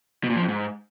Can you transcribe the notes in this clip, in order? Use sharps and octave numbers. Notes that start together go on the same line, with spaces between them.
B2
A#2
F3
F2
G#2